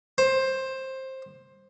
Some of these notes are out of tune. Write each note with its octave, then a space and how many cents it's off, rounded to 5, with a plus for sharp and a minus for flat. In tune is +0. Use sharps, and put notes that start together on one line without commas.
C5 +15